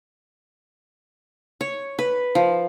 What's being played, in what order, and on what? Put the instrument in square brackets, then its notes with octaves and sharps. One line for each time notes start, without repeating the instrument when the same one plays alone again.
[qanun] C#5
B4
F3